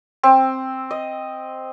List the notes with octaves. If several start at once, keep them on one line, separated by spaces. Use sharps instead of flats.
C4
D#5